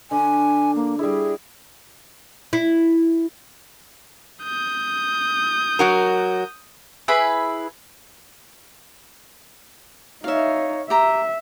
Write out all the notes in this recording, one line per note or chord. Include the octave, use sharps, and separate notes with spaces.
D3 D4 G#5
A#3
G3 E4 G#4
E4
D#6 G6
F#3 F#4 A#4
E4 G#4 B4 B5
D#4 C#5 E5 F5
G4 E5 A#5